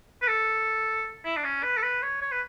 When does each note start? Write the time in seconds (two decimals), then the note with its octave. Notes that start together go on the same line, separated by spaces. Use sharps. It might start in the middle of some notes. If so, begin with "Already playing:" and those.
0.22 B4
0.28 A4
1.25 E4
1.37 D4
1.44 C#4
1.63 B4
1.77 A4
1.82 B4
2.02 C#5
2.22 C#5
2.32 B4